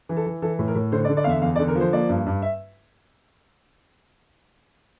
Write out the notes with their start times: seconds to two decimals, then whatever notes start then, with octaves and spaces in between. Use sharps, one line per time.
0.09 E3
0.16 A4
0.26 E3
0.42 E3 A4
0.59 A2
0.68 A#4
0.75 A2
0.92 D3 C5
1.05 D5
1.09 D3
1.17 D5
1.24 E2 E5 F5
1.42 E2 F5
1.55 D5
1.59 D3
1.68 A#4
1.75 F3
1.80 C5
1.93 A#3 D5
2.09 G2
2.26 G2
2.42 E5